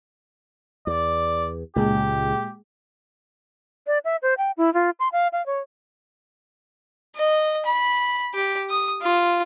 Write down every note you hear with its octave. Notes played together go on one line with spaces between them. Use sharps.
E2 D5
C#2 A#2 G#3 G4 G#4
D5
E5
C5
G5
E4
F4
C6
F5
F5
C#5
D#5
B5
G4
D#6
F4